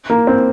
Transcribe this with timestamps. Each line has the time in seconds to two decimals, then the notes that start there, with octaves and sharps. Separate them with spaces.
0.10 A#3
0.27 C4